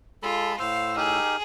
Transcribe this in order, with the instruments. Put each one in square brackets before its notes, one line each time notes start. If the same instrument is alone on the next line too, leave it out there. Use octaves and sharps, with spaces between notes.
[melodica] G#3 A5 B5 [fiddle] F4 [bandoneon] A4
[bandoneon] A2 E6 [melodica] C5 [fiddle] F5
[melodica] D#4 G4 A#4 [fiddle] G#4